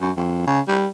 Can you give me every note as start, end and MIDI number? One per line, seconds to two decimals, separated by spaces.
0.01 0.12 42
0.17 0.43 41
0.47 0.60 49
0.68 0.87 55